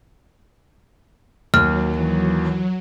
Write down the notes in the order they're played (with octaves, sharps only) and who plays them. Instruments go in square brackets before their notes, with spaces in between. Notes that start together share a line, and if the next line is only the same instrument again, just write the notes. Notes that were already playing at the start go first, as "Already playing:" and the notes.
[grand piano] D#2 [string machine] F#3 [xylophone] F6
[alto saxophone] E3